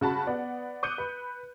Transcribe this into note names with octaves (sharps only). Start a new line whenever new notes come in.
C#3 F#4 A5 B5
B3 D5 F#5
D6 D#6 F#6 G6 C#7 D#7
B4